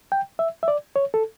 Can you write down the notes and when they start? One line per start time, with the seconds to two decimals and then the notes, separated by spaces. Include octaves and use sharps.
0.12 G5
0.39 E5
0.63 E5
0.68 D5
0.96 C#5
1.14 A4